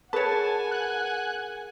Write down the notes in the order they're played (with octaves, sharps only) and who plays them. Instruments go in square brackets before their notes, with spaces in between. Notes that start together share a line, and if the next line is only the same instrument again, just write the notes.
[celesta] G#4 A#4 C#7 [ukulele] B4 C#5 [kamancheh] F#5 G#5 [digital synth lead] A5
[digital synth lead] F#6